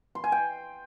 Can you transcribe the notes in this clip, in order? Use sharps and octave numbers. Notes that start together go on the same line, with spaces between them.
C6
G#5
G5